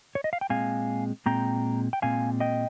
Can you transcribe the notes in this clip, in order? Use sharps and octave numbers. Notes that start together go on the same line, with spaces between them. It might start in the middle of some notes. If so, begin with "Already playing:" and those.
C#5
D#5
F5
G5
A#2 G#3 C4 F5 G#5
A#2 G#3 C4 G5 A#5
G5
A#2 G#3 C4 F5 G#5
D#5 G5